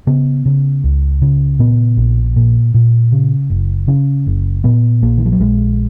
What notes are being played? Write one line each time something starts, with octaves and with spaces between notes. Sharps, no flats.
C#3 B3
C#3
C#2
C#3
A#2 B3
A#1
A#2
A#2
C#3
F#1
C#3 C#4
F#1
A#2 B3
A#1 A#3
D#3
F3
F#3
A#1 G#3